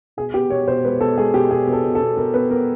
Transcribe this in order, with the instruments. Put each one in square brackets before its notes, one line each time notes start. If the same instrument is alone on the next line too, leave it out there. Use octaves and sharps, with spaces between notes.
[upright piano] B2 G#4
B3 G4
B2 C#5
B2 C5
G#3 B4
B2 A4
G#3 G#4
B2 G4
B2 G#4
B2
A4
B2
A4
B2
B2 A#4
B3 B4
B3 A#4